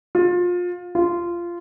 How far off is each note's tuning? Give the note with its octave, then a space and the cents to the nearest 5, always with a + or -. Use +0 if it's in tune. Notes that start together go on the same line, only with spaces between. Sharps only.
F4 +25
F4 -15